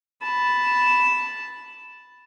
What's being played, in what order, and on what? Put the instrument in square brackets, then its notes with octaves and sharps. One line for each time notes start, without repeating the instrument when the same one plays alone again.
[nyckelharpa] A5 B5